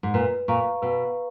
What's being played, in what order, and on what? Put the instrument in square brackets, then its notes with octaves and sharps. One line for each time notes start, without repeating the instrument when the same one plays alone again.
[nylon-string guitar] G#2
[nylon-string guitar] A#2 [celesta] B4
[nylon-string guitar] A#2 [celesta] F5 A#5 C#6
[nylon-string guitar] B2 [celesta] B4